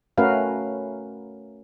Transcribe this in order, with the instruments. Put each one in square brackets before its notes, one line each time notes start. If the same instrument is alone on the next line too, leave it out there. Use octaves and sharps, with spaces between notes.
[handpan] A3 C#4 F#4 A#4 B4 F5